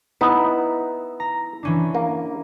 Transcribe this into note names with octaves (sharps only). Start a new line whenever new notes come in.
B3 D#4 E4
A#5
E3 C#4 D4
A#3